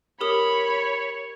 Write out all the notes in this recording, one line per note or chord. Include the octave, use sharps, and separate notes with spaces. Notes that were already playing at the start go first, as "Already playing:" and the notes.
G4 A#4 C#5 B5 D#6